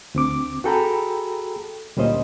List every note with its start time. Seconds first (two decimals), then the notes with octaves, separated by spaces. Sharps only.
0.15 D2 C4 D6
0.64 F#4 G#4 A4 G5 A#5 B5
1.96 D2 A#2 G3 C#4 C5 D#5